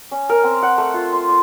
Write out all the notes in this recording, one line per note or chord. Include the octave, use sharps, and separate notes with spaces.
C#4
A#4
C4
F#5
A3
F4
C6
D6